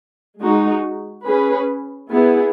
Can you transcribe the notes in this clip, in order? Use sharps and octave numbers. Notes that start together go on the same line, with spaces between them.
G#3 D#4 F#4
C#4 G#4 B4
B3 E4 G#4